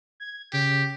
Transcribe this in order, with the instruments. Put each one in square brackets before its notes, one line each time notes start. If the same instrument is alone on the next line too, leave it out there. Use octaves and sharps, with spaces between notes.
[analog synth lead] G#6
[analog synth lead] C#3 [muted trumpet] G4